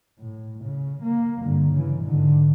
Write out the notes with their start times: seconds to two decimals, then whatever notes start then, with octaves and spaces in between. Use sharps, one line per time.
0.20 A2
0.64 C#3
1.02 A#3
1.43 G2 D3
1.73 C#3 E3
2.04 G#2 D3